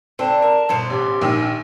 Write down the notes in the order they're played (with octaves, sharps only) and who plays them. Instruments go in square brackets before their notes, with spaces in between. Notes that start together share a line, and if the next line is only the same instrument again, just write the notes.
[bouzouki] D3 [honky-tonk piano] C4 [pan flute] A5
[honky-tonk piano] A#4
[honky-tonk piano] G1 [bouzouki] B2 C5
[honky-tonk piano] A1 [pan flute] G4
[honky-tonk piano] A#1 D#3 E6